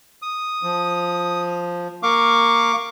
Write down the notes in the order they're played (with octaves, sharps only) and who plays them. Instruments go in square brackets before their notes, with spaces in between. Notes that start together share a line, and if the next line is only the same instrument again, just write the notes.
[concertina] D#6
[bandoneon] F3
[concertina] A#3 F5 [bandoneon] C#6 D6